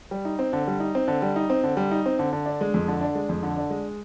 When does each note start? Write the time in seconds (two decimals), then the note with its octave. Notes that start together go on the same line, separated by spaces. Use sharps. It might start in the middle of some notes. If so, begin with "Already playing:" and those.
0.11 G3
0.25 D#4
0.39 C4
0.53 D3
0.67 G3
0.80 D#4
0.95 C4
1.08 D3
1.22 G3
1.36 D#4
1.50 C4
1.64 D3
1.77 G3
1.91 D#4
2.06 C4
2.19 D3
2.33 D3
2.46 D4
2.61 G#3
2.74 F2
2.88 D3
3.01 D4
3.15 G#3
3.29 F2
3.43 D3
3.57 D4
3.70 G#3